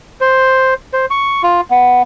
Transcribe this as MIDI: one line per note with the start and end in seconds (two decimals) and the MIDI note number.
0.21 0.74 72
0.93 1.06 72
1.10 1.42 85
1.43 1.61 65
1.71 2.03 59